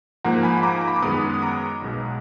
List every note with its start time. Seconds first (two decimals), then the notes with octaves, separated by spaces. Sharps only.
0.24 G#2 F3 A#3 F#5 A#5
0.43 G#5 B5
0.58 B5
0.63 A#5 D6
0.81 A#5
0.88 B5
0.96 D6
1.02 F#2 D#3 G#3 B3 B5 D#6
1.34 D#6
1.42 A#5 D6
1.82 B1 B2 G#3